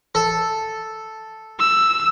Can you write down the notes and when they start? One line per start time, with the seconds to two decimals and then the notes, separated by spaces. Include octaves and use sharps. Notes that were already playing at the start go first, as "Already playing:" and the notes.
0.15 A4
1.59 E6